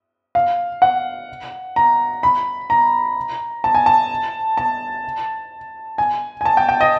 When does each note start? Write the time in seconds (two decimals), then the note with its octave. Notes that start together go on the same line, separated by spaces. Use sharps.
0.35 F5
0.82 F#5
1.76 A#5
2.23 B5
2.70 A#5
3.64 A5
3.75 G#5
3.86 A5
4.58 A5
5.98 G#5
6.41 G#5
6.45 A5
6.57 G5
6.69 G5
6.81 D#5